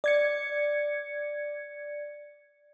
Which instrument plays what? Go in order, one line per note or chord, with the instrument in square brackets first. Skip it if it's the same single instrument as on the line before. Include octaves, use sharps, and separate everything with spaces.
[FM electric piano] D5 G#6 C#7